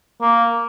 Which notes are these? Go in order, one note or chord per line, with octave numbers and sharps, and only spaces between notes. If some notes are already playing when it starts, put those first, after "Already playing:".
A#3